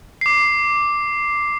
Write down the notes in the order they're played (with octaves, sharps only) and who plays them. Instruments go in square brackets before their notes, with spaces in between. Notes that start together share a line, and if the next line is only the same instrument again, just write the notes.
[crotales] D6 C7